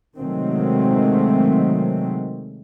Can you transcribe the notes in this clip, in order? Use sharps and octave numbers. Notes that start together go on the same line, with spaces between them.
C3 D#3 F#3 G#3 A3 C4